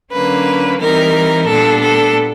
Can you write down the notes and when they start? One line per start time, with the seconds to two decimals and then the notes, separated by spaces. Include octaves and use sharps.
0.13 D3 F#3 A#3 C#4 B4
0.80 E3 G3 C4 D#4 A#4
1.48 A#2 G3 B3 D4 A4
1.82 A4